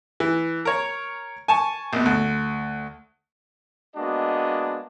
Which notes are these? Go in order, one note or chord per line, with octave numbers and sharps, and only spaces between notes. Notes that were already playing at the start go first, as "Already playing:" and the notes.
E3
A#4 C#5
G#5 A5 C#6
A#1 B2
D2
G#3 A#3 B3 D4 F#4 D#5